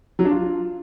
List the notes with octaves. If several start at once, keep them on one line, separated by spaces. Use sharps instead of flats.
F#3
D4
F4